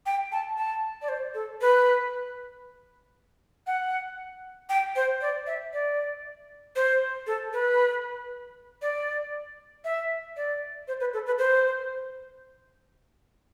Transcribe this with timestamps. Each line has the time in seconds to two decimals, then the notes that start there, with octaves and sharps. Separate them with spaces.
0.06 G5
0.32 A5
0.57 A5
1.02 D5
1.09 C5
1.34 A4
1.61 B4
3.67 F#5
4.70 G5
4.96 C5
5.21 D5
5.47 E5
5.73 D5
6.76 C5
7.27 A4
7.53 B4
8.82 D5
9.84 E5
10.36 D5
10.88 C5
11.00 B4
11.13 A4
11.26 B4
11.39 C5